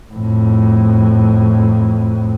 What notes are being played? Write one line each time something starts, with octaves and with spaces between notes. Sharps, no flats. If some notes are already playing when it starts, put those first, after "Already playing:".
F2 A2